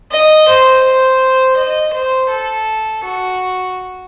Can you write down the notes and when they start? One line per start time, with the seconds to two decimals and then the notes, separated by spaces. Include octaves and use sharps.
0.12 D#5
0.48 C5
0.84 C5
1.57 D#5
1.94 C5
2.30 A4
3.04 F#4